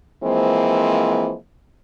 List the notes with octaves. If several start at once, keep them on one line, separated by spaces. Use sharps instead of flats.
E3 F3 G#3 A#3 C4